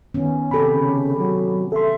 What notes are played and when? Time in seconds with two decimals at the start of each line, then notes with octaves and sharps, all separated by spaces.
0.14 D#3 B3 C#4
0.51 C3 G4 A4 B5
0.71 C#3
1.18 F#3
1.72 A4 E5 C6